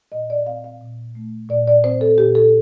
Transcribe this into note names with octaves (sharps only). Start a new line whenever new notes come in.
A#2 D#5
D5
C4 F5
F5
A#2
A3
A#2 D5
D5
C4 C5
A4
A#2 G4
A4